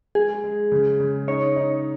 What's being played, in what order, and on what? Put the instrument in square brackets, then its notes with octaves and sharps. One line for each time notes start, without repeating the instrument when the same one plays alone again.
[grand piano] G#3 [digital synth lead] G#4
[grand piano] G#3
C#3
C#3
[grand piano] D#4 [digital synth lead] C#5
[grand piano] D#4